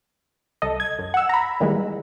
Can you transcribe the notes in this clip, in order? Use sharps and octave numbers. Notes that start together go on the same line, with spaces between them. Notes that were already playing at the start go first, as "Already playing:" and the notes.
C2 A4 D#5
G#6
F#2
F#5 E6
A#5 B5
A#2 D#3 E3 G3 G#3